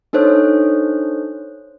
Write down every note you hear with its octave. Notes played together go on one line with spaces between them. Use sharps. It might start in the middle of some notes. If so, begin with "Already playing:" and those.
D4 D#4 A4 C5 C#5